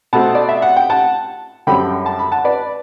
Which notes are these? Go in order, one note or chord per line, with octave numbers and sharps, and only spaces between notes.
B2 A3 C4 F#5 A5
D5
E5
F#5
G5
F#5 A5
F#2 D3 G3 C4 G5 B5
A5
B5
F#5 A5
B4 D5